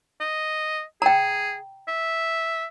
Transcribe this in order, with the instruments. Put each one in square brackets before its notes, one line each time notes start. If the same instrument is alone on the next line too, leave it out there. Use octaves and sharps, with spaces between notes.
[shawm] D#5
[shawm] G#4 [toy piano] G5 A#5
[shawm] E5